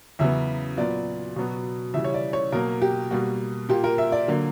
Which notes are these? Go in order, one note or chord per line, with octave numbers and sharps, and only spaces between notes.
E2 C#3 F#3 B3 E5
A#2 F#3 B3 D5
B2 F#3 B3
C#3 E3 G3 E5
C#5
D5
C#5
B2 F#3 A#3 A#4
G4
B2 G3 A#3 F#4
A#2 A#3 G4
A#4
E5
D5
D3 F#3 A#3